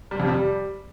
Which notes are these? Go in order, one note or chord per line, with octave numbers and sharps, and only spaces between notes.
G3
F2
G3